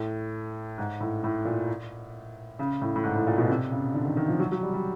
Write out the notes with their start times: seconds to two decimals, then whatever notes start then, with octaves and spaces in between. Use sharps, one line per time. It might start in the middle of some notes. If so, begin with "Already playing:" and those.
Already playing: A2
0.78 G#2
1.00 A2
1.24 A2
1.45 A#2
2.59 C#3
2.81 A2
2.96 A2
3.04 G#2
3.16 A2
3.26 A#2
3.38 B2
3.49 C3
3.71 C#3
3.94 D3
4.05 D#3
4.17 D#3
4.28 F3
4.39 F#3
4.52 F#3
4.63 G3
4.74 G3